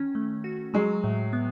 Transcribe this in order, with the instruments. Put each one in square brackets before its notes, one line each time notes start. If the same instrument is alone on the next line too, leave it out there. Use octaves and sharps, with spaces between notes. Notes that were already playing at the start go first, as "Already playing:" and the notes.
Already playing: [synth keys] D#3 C#4
A3
F#4
[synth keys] F#3 [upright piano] G#3
[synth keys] A2
B3